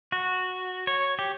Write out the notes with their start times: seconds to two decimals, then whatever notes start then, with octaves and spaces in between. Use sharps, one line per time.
0.12 F#4
0.87 C#5
1.19 G4